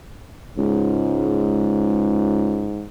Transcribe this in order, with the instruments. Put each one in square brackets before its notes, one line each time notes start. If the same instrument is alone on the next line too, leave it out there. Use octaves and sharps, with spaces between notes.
[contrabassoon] C#2 [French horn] G#2